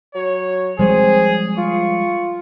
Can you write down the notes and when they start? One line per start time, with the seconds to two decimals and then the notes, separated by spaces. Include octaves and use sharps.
0.15 F#3 C#5
0.79 F3 G3 G#3 C4 G#4
1.58 F4 C#6